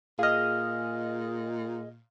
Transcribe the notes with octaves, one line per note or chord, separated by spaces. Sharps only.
A#2 G#4 D#5 F5 F6